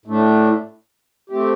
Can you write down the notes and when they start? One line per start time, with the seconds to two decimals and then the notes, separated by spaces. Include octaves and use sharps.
0.06 A2 A3 D4
1.30 A3 C4 G4